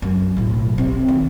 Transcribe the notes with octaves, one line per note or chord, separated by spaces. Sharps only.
F#2
B1 A2
C3
D#3